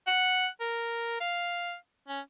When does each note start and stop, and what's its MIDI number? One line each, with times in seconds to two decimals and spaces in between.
0.07 0.48 78
0.61 1.16 70
1.21 1.75 77
2.08 2.20 61